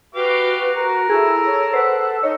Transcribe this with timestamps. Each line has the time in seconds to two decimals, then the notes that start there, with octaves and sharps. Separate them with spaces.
0.15 F#4 G4 B4 F5 D6
0.76 A#4
1.10 E4 G#4 A4
1.45 C#5
1.73 B4 C5 F#5
2.23 D#4 C#5 D#5